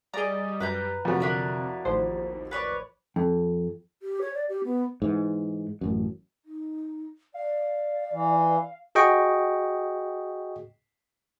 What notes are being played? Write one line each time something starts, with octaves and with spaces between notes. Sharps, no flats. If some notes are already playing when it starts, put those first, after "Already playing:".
G3 G#4 D5 D#5 A#5
F#2 B4 A#5 G6
F2 C3 F#3
D3 D4 E4 A#4
A1 D#2 F3 C5
B4 C#5 D5
F2
G4
C#5
D5
G4
B3
G#2 E3
A1 F#2
D#4
D5 F5
E3
F#4 G#4 D#5 G5 C#6